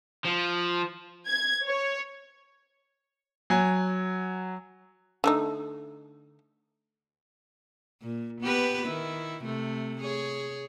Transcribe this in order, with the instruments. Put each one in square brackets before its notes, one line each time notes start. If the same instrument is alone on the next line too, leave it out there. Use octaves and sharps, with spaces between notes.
[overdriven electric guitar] F3
[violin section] G#6
C#5
[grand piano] F#3 G#5
[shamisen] D3 A3 D#4
[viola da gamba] A#2
B3 G4 B4
D#3 E4
C3 A3
G#4 C#5